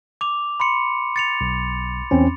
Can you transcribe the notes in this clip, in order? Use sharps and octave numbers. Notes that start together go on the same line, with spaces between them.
D6 F7
B5 C6 C#7
A6 C#7 F7
B1
E2 C4 C#4